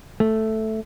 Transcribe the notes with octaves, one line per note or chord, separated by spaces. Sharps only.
A3